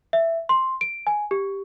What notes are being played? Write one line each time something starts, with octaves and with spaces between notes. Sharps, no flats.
E5
C6
D7
G#5
G4